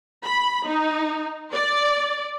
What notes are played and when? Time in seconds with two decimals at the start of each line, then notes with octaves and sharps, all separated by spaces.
0.25 B5
0.67 D#4
1.52 D5